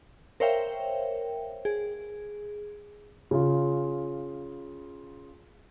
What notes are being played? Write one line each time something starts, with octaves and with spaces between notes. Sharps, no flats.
A#4 C5 C#5 E5 F5 G5
G#4
C#3 F4